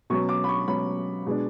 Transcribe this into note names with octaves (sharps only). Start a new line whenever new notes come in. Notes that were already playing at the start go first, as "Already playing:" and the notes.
B2 F#3 C#4 C#6
D6
B5
C#6
B2 F#3 C#4 B5
B2 G#3 D4